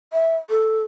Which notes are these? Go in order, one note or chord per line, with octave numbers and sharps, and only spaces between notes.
E5
A4